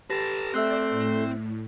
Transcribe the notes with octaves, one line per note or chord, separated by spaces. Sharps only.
G4 A4 B4 A5 A#6
A3 C4 D5 E5 C6 E6 F#6
A2